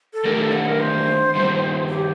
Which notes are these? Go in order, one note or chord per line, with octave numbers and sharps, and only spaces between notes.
A4
D#3 A3 D4 G4 A#4
A4
F#5
A#4
C5
G2 D#3 G3
G4